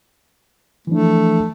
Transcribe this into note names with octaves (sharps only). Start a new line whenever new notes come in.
E3 F3 A3 D4